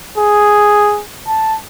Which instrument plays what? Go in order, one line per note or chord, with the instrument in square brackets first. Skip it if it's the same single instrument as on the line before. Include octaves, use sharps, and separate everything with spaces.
[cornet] G#4
A5